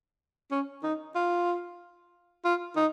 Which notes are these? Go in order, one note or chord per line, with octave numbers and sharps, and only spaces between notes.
C#4
D#4
F4
F4
D#4